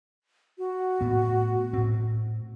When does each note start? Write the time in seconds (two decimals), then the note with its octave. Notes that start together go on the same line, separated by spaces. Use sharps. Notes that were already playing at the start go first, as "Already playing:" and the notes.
0.58 F#4
1.01 A2 B3
1.73 A2 C4